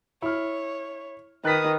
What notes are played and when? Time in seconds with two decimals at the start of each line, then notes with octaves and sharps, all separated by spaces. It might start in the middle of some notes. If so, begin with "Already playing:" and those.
0.22 E4 C#5 F6
1.45 D#3 B4 D#6 F#6 A6 B6